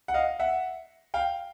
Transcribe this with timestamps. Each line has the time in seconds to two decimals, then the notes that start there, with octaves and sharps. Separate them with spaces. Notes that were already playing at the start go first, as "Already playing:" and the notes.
0.08 F#5
0.14 D#5 F5
0.39 E5 F#5
1.14 F5 G5